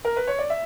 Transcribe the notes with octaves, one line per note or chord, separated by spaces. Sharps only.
A#4
B4
C#5
D5
E5